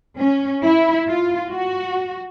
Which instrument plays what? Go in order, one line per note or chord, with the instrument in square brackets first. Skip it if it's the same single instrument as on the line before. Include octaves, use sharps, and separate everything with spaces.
[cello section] C#4
E4
F4
F#4